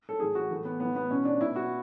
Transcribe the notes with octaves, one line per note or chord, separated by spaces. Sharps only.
A4
A2 E3 G#4
F#4
A2 E3 A3
B3
A2 E3 B3
B3
B2 C#4
D4
B2 E4
F#4